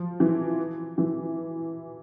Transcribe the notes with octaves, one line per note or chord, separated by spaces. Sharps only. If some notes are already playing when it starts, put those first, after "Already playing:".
Already playing: F3
E3
E3